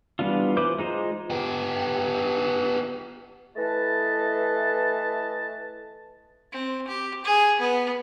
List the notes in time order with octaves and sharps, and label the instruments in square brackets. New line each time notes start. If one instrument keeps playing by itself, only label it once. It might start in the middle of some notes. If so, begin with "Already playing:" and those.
[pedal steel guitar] E3 G3 B3 D4 F4
E3 B4 C5 D6 G6
G#3 D#4 F4 C5
[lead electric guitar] B3 G4
[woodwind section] E3 A3 B4 D#5 A5
[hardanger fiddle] C4
G4
G#4
B3